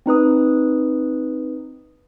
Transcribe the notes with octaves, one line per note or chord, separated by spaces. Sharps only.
C4 D#4 B4 D#6